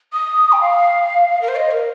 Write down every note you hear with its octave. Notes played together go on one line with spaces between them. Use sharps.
D#6
G5
F5
A#4
C5
D#5
A#4